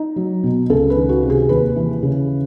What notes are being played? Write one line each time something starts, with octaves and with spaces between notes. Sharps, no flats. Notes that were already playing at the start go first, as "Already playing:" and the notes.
Already playing: D#4
F#3
B2
C#2 A4
B4
D#3
F#4
C3
G#4
D#2 B4
E3
C#3